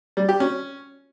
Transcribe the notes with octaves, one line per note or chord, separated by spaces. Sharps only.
G3
G4
C#4